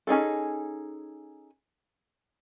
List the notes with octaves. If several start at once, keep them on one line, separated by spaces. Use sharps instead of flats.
C#4 D#4 G#4 A4